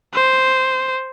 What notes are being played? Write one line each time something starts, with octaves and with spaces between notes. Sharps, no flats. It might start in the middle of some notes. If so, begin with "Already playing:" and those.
C5